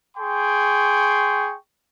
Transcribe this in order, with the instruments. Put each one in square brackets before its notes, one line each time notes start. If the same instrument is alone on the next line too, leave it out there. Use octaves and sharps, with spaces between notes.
[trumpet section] G#4 G5 C6 C#6